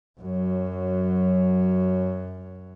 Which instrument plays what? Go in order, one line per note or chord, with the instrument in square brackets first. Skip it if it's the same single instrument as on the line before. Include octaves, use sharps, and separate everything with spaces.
[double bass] F#2 F#3